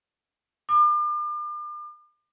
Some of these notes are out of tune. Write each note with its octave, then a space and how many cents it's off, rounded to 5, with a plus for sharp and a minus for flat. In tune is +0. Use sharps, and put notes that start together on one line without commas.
D6 +40